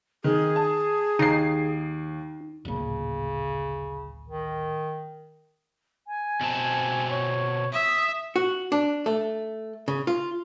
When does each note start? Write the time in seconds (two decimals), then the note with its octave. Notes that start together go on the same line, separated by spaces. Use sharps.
0.24 D#3 G#4
0.56 A5
1.19 D#2 D#4 C7
2.65 D1 A1 A#2 C#3
4.28 D#3
6.07 G#5
6.41 B2 C4 A5
7.10 C#5
7.73 E5 D#6
8.36 F#4
8.72 D4
9.06 A3
9.88 C#3
10.07 F4